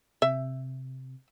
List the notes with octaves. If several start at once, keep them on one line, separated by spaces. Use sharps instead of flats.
C3 E5